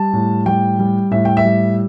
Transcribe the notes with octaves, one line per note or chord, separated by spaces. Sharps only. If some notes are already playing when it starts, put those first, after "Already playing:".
Already playing: G3 A5
A2
G3 G5
G3
A2 E5
G5
E5
G3